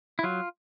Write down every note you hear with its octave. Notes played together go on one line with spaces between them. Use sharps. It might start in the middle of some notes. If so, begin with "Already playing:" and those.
E4
F#3 F4